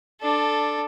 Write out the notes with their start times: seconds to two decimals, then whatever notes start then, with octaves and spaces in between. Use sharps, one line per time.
0.21 D4 A4